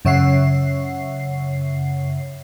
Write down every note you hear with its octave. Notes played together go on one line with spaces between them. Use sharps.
F#2 C#3 C#5 E5 F#5 C7